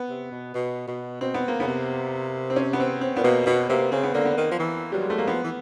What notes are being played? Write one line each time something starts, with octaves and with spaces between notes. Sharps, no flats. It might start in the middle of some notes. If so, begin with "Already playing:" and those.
Already playing: B3
C3
B2
B2
B2
B2 C4
B3
A#3
C#3 B3
C3
C4
C#4
B3
C4
C4
A#2 B3
B2 A#3
B2 B3
C3 A#3
C#3 C4
B3
D3 A#3
B3
D#3
F3
E3
F#3 G3
G#3
A3
A#3
F3 B3
E3